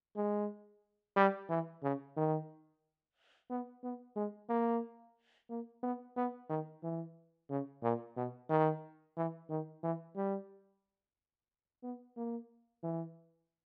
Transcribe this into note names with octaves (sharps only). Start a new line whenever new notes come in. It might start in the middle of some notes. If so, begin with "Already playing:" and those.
G#3
G3
E3
C#3
D#3
B3
B3
G#3
A#3
A#3
B3
B3
D#3
E3
C#3
A#2
B2
D#3
E3
D#3
E3
G3
B3
A#3
E3